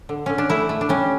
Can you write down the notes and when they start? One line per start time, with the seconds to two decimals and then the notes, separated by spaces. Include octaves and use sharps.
0.09 D3
0.26 D3 C#4
0.38 D4
0.50 A3 E4
0.69 A3
0.81 D4
0.89 G3 C#4